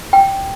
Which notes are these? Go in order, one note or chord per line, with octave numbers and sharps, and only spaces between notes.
G5